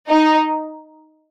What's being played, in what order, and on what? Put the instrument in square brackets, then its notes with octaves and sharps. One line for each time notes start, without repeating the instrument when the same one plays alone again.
[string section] D#4